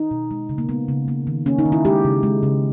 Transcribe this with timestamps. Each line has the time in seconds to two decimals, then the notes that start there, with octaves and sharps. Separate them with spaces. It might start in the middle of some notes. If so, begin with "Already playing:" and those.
Already playing: D#4
0.11 B2
0.31 G#3
0.49 C#3
0.58 A#3
0.69 G#3 B3
0.88 C#3
1.08 A#3
1.27 D#3
1.46 A#3 C#4
1.59 D#4
1.66 D#3
1.72 E4
1.85 G#3 G4
2.04 C#3
2.23 G#3
2.43 C#3